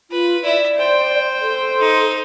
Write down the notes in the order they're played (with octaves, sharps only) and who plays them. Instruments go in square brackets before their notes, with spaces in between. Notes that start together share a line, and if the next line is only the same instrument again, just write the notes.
[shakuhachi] F4 [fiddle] B4
[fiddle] E4 E5 [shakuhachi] D5
[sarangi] C5 [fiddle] G5
[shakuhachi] A4
[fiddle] D#4